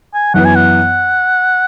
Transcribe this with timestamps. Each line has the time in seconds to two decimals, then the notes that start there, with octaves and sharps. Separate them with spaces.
0.14 G#5
0.34 F#2 E3 B3 F#5
0.45 G#5
0.55 F#5